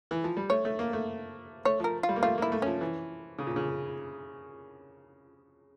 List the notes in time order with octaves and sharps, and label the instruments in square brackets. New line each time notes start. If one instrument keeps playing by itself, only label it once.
[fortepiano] E3
F3
G3
[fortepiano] A3 [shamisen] C#5
[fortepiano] A3
A#3
A3
[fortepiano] A3 [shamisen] C#5
[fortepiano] F3 [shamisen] A#4
[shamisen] F4
[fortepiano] G3
A#3
[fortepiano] A3 [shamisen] F4
[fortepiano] A#3 [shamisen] E4
[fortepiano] A3
[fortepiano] F3 [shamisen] C#4
[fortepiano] E3
C#3
A#2
C#3